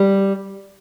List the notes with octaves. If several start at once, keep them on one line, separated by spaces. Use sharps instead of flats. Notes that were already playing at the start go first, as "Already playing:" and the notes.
Already playing: G3